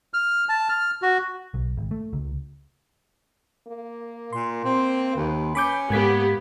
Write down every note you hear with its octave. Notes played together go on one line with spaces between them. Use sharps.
F6
A5
F6
F#4
B1
G#1
A3
C#2
A#3
A#2 C6
C4
D#2 B4
C#4 B5 D6 G6
G#2 A#3 B3 G4 G#6 B6